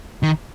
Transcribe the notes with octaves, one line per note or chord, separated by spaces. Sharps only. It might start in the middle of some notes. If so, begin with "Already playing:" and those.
D#3